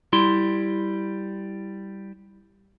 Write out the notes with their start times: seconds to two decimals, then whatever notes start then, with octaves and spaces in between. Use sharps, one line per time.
0.13 G3 E4 C6